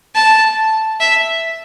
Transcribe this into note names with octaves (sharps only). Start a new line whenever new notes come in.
A5
E5